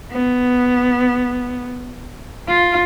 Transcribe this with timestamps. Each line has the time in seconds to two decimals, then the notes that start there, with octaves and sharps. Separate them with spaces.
0.12 B3
2.48 F4